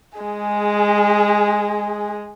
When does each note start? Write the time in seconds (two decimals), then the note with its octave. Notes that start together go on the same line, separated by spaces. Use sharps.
0.19 G#3 G#4